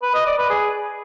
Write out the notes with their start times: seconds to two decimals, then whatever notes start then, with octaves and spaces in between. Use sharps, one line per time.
0.03 B4
0.15 D#5
0.26 D5
0.38 B4
0.50 G#4